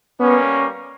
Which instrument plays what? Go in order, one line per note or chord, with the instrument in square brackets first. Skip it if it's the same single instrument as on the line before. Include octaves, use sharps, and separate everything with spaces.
[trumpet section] G3 A#3 C#4 [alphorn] B3